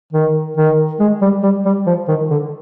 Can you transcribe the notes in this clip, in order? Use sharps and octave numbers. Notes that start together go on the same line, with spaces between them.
D#3
D#3
G#3
G3
G3
G3
F3
D#3
D3